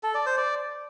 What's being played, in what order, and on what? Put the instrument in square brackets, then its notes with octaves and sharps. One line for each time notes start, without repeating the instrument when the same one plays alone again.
[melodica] A4
D5
C5
D5